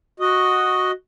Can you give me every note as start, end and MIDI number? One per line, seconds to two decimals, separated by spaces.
0.20 0.91 66
0.20 0.91 75